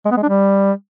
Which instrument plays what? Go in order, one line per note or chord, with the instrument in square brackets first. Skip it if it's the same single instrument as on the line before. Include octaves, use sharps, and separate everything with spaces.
[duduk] G#3
B3
G#3
D4
G3